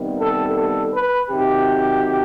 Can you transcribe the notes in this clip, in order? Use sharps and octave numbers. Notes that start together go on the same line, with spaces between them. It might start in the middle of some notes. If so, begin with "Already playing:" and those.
Already playing: C3 D#3 G3 B3
A4
A4
B4
C3 D#3 F#3 G4